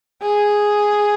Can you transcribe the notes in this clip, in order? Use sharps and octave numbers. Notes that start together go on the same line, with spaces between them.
G#4